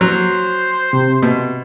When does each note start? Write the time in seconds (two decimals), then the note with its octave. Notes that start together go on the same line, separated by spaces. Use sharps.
0.01 F#3 C5
0.93 C3
1.22 B2